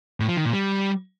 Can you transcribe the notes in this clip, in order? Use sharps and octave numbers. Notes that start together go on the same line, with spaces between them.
A2
F3
D#3
A#2
G3